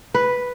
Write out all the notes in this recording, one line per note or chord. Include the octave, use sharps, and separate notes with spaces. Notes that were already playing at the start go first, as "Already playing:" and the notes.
B4